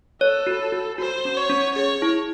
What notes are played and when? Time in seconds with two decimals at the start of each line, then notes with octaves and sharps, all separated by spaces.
0.21 A4 C#5
0.47 F#4
0.72 F#4
0.98 F#4 C5
1.25 C#4
1.37 C#5
1.50 C#4
1.75 G#4 C#5
2.02 E4